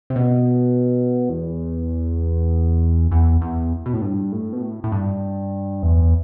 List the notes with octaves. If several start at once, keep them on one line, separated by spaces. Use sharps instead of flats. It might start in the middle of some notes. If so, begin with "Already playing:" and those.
C3
B2
E2
E2
E2
B2
A2
G2
A2
B2
A2
A2
G2
E2